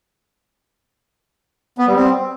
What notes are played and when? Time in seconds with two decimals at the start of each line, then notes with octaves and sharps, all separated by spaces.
1.78 B3
1.87 G3
1.96 C4